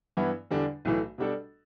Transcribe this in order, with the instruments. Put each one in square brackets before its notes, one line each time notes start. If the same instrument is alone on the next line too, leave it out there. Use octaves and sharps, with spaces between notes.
[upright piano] G2 E3 B3 E4
E2 D3 G3 D4
B1 A2 E3 A3
B2 G3 D4 F#4 A4